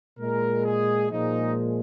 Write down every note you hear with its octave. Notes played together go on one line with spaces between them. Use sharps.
A#2 G#3 A#4
G#4
A#2 F3 G#3 D#4